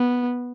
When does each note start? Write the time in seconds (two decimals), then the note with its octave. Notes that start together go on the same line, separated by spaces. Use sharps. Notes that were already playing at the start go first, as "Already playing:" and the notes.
Already playing: B3